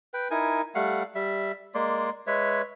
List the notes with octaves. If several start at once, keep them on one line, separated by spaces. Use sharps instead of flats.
B4 G5
D#4 E4 A#4 G#5
G3 A3 F5 F#5
G3 E5
G#3 A#3 D5 C6
G#3 B4 C#5 E5